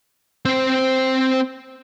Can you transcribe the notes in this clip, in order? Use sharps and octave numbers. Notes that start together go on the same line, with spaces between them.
C4 C5